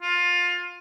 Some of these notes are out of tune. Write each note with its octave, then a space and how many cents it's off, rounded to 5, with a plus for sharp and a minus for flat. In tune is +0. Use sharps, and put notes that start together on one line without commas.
F4 +20